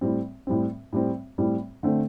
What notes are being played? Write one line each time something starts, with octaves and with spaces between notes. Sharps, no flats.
A2 G3 C4
A2 G3 C4
A2 G3 C4
A2 G3 C4
D3 A3 C4